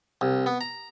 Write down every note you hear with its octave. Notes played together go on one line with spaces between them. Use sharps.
C2
B3
A#5